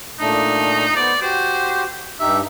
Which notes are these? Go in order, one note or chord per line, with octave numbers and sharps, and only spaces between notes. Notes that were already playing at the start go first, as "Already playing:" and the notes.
A#2 A3 D4 D#4
B3 C5 D5
F#4 G4 C5
G2 D#4 G4 E5